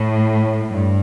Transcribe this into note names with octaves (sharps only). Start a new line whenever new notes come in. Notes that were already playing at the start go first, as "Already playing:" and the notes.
Already playing: A2
G2